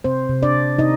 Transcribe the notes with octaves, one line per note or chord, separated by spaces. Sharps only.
C3 C4 C5
C3
D4 D5
C3
C3 D#4 D#5